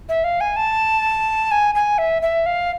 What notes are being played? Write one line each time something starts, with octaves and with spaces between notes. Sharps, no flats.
E5
F5
G#5
A5
G#5
G#5
E5
E5
F5